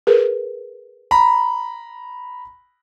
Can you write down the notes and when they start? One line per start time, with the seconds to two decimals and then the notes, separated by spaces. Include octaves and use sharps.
0.07 G#4 A#4 B4
1.11 A#5 B5